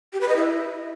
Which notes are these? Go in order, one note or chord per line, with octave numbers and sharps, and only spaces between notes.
G4
B4
D#5
E4